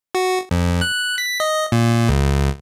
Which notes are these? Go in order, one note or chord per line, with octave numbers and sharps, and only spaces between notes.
F#4
F2
F#6
B6
D#5
A#2
C#2